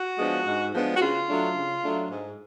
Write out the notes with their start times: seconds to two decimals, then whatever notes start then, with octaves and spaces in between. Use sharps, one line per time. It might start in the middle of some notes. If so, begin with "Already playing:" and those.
Already playing: F#4
0.19 F3 G#3 B3 D4
0.47 G#2
0.74 F3 G#3 B3 D4
0.96 F#4
1.01 C#3 F4
1.28 F#3 A3 D4
1.57 C#3
1.83 F#3 A3 D4
2.11 G#2